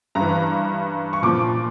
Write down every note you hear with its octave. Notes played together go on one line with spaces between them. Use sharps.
G2 A#5
E3
C#6
A#2 F3 D6